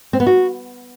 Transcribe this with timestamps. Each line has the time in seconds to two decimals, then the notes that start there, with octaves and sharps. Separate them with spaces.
0.13 C4
0.20 B3
0.27 F#4